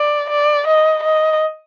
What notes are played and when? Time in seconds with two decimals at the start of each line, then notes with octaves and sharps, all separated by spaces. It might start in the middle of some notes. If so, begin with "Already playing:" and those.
Already playing: D5
0.30 D5
0.67 D#5
1.04 D#5